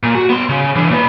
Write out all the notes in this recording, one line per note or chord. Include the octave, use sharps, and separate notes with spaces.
A#2
F#4
B3 C6
C#3
E3 D4
A#2 B4